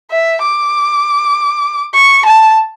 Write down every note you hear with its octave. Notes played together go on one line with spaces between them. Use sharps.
E5
D6
C#6
A5